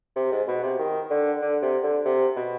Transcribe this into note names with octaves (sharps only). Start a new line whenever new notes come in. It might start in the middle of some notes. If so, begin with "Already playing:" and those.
C3
G#2
B2
C3
D#3
D3
D3
C3
D3
C3
B2